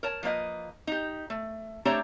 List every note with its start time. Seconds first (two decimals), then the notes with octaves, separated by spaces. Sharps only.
0.03 A#4 C#5 A5
0.23 F3 A#3 B4 D#5
0.87 D#4 G4
1.30 A3
1.85 A3 C4 D4 G4 C#5 A#5